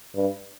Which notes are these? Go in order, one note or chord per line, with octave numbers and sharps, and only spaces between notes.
G2